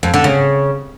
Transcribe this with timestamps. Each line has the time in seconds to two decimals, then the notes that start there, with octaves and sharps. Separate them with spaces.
0.03 F2
0.14 D3
0.24 C#3